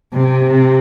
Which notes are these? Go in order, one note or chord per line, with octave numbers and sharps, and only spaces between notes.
C3